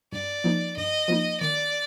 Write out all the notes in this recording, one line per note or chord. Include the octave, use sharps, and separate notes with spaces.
G2 D5
F3 A#3 D#4
G2 D#5
F3 A#3 D#4
D#3 D5